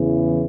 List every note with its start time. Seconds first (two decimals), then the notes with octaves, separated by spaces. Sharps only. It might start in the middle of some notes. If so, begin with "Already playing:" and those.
Already playing: E2 C#3 E3